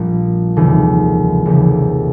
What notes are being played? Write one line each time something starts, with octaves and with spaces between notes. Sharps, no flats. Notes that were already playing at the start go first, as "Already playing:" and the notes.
Already playing: A#1 A#2 G3
F1 D#2 C#3 E3 G3
F1 D#2 C#3 E3 G3